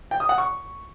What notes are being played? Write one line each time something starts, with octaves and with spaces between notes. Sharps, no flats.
G5
D#6
F#5
C#6